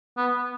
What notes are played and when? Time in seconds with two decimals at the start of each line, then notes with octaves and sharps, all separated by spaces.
0.17 B3